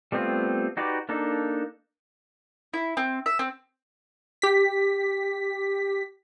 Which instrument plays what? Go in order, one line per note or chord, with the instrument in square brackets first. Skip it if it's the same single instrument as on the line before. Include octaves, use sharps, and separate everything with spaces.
[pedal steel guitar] G3 A3 B3 C4 F4
D#4 F#4 G4 B4 D5
A#3 D4 D#4 A4
[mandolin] E4
C4
E5
C4
[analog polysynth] G4 B6